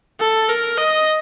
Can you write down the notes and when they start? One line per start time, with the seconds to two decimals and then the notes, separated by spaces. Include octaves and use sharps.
0.20 A4
0.49 A#4
0.78 D#5